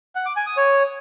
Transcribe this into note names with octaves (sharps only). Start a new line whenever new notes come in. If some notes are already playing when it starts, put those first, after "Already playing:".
F#5
D6
G#5
D#6
C#5